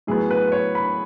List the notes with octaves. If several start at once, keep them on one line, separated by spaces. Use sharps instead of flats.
A2 F#3 B3 G#4
B4
B4
C#5
B5